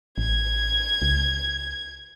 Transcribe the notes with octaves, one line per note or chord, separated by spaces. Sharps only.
A1 G#6
C#2